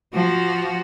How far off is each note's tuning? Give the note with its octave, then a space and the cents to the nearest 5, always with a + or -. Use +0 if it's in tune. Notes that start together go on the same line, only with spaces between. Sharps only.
F3 +0 F#4 +15